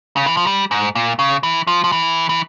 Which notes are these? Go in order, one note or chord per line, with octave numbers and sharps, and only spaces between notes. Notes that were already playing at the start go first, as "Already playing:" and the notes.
C#3
E3
F3
G3
G#2
A#2
C#3
E3
F3
F3
E3
E3